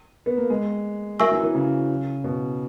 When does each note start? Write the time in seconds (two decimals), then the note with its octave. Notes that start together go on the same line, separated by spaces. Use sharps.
0.26 B3
0.37 A#3
0.50 G#3
1.19 F#3 A#4 E5 G#5 C#6 E6
1.31 E3
1.43 E3
1.55 C#3
2.24 B2